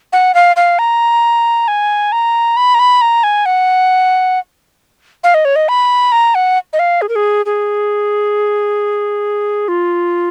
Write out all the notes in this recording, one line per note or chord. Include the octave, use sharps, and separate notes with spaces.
F#5
F5
F5
A#5
G#5
A#5
B5
A#5
B5
A#5
G#5
F#5
F5
D#5
C#5
D#5
B5
A#5
F#5
D#5
F5
G#4
A#4
G#4
G#4
F4